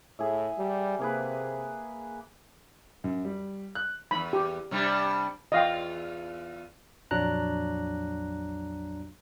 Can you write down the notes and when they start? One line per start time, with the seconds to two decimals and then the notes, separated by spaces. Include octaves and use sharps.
0.19 A2 G#4 E5
0.58 G3
0.99 C3 A#3 G#4 B4
3.04 F#2
3.25 G3
3.75 F#6
4.11 E2 G#2 B5
4.33 G4
4.71 C3 G3 D4
5.52 E2 F4 D#5 F5 G5
7.11 A#1 F2 F#3 D4 A#5 F#6